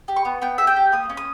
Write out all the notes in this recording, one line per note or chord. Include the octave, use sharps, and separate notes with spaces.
G4
C#6
B3
B3 G5
G4 E5
G5
G4
A#3 D#6
C#4
D#6